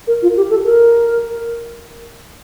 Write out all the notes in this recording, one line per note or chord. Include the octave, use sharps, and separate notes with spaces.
A#4
F4
G4
A4
A#4